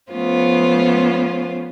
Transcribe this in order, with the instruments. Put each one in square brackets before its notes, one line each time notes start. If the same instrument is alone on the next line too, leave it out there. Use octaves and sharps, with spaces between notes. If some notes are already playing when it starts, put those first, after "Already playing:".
[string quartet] F3 A3 B3 C#4 F4 C5